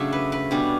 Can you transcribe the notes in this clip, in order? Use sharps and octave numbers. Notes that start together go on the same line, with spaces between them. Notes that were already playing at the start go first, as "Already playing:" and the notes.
Already playing: C#3 F#3 A3 D4 E5
B4
B4
B2 G3 C#4 D4